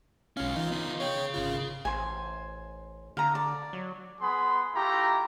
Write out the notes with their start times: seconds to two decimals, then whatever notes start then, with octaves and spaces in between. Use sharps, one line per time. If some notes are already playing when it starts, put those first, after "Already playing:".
0.37 B1 G#3 C#4 F5
0.56 E3 D#4 F4
0.71 B3 D#4 F4
1.00 G#4 C#5 F5 G5
1.34 G#1 C#3 F4
1.85 A1 C5 G#5
3.17 D3 F5 A#5
3.35 D5
3.73 F#3
4.21 B3 G#4 B5 C6
4.75 A3 E4 F4 G4 A#5